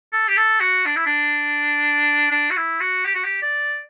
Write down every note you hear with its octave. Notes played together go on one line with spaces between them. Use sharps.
A4
G4
A4
F#4
D4
E4
D4
D4
F#4
E4
F#4
G4
F#4
G4
D5